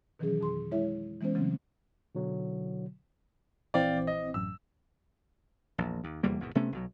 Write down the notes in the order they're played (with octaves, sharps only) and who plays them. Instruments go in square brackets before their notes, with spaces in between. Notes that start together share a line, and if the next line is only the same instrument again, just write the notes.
[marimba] B2 D#3 E3 F#3 C#4 G#4
F2 B2 G#4 C6
G#3 E4 C#5 E5
E3 G#3 B3 C#4 C5
C#3 E3 F#3 A3 C4 C#4
[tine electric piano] B2 D3 F#3
[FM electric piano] A#1 E3 C4 [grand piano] D5 F5 G5
[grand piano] D#5
[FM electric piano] A1 F#2 [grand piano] E6
[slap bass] A#1 E2
D#2
F1 E2 G3 A#3
G#1 E2 B2
C3 A3 B3 C#4
B1 B2 F#3